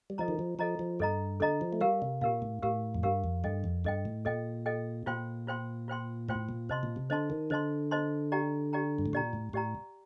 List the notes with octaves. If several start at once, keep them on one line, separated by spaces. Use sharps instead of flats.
G3
F3 A4 D#5 A#5
D#3
F3
F3 A4 D#5 A#5
F3
G2 A4 D#5 A#5
D3 A4 D#5 A#5
F3
A3
G3 G4 A#4 F5
C3
A#2 G4 A#4 F5
A2
A2 G4 A#4 F5
F2
G2 G4 A#4 F5
F2
G2 A4 D#5 G5
F2
G2 A4 D#5 G5
A2
A#2 A4 D#5 G5
A4 D#5 G5
A#2 F4 C5 G5 C6
F4 C5 G5 C6
F4 C5 G5 C6
A2 F4 C5 G5 C6
A#2
C3 C5 D#5 A5 C6
A#2
C3
D3 C5 D#5 A5 C6
D#3
D3 C5 D#5 A5 C6
C5 D#5 A5 C6
G4 D5 G5 A#5
G4 D5 G5 A#5
G2
A2
A#2 G4 D5 G5 A#5
A2
A2 G4 D5 G5 A#5